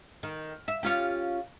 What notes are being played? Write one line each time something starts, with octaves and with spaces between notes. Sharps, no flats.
D#3
E5
C#4 F4 G4